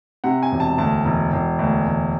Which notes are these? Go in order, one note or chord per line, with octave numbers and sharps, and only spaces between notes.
C3 F#5
G#5
E1
A5
D2 A5
E1
E1
D2
E1